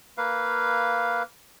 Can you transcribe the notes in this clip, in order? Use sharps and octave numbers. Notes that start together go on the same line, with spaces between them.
A#3 B4 F5